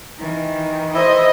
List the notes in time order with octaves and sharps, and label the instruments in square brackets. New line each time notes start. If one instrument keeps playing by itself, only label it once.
[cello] D#3 E3
[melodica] E4 E5 [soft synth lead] C5 [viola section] D#5